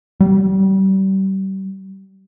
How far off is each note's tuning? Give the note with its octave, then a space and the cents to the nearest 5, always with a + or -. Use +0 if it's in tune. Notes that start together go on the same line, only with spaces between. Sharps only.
G3 -35